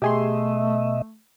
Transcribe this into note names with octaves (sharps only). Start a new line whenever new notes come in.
B2 A3 G4 G#4 D#5 E5 C6